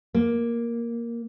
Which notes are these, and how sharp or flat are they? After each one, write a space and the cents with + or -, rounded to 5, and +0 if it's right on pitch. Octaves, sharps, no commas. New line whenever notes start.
A#3 +5